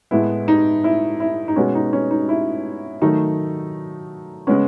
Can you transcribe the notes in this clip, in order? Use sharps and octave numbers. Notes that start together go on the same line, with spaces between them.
A2 G#3 B3 E4
D#4
E4
E4
D#4
B2 G#3 B3 C#4
D#4
C#4
D#4
E4
D#3 F#3 A3 D#4
C#3 G#3 B3 C#4